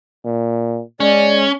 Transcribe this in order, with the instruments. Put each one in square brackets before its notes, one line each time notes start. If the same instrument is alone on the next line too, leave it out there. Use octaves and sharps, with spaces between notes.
[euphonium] A#2
[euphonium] G#3 [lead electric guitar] C#4 [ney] D5